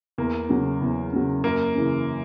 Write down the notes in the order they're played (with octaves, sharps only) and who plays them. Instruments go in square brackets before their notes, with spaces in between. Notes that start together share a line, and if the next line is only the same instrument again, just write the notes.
[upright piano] E2 [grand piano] A#3
[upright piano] C#3 F#3
E2
C#3 F#3
[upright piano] F#2 [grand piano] A#3
[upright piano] C#3 E3